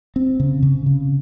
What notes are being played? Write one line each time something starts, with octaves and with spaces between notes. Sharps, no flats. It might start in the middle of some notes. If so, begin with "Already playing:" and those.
C4
C#3
C#3
C#3